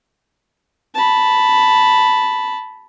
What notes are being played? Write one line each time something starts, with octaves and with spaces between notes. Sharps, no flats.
A5 B5